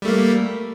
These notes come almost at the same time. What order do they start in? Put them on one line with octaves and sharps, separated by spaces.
G3 A3 A#3